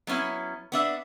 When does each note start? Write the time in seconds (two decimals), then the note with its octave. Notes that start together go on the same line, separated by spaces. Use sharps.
0.07 F#3 B3 C#4 E4
0.72 B3 D4 E5